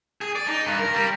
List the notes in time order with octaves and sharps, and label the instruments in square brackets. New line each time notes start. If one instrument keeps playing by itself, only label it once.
[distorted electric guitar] G#4
D5
D#4
G2
A#4
G3